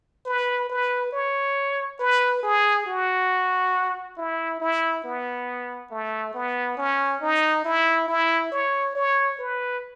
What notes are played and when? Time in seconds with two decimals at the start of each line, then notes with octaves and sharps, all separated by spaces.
0.26 B4
0.69 B4
1.12 C#5
2.00 B4
2.43 G#4
2.86 F#4
4.17 E4
4.60 E4
5.04 B3
5.91 A3
6.34 B3
6.77 C#4
7.22 D#4
7.65 E4
8.08 E4
8.52 C#5
8.95 C#5
9.39 B4